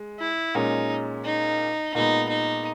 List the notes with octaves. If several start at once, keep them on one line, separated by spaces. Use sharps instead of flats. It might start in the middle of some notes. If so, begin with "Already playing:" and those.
Already playing: G#3
E4
A#2 G#3 C#4 D#4
D#4
A#2 G#3 B3 D#4
D#4